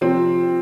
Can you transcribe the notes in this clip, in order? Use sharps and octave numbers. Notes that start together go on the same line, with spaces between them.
C3 F3 C4